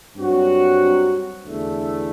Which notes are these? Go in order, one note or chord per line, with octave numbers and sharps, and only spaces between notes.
G2 F#3 C4 F#4
E2 D3 A3